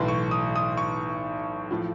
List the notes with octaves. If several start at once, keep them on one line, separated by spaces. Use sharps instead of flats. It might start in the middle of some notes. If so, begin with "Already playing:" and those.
Already playing: B1 A2 E3 C6
C#6
D#6
D#6
C#6
A2 F3